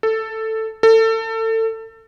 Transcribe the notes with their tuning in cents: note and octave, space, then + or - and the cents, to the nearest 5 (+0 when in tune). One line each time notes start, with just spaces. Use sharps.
A4 +10
A4 +30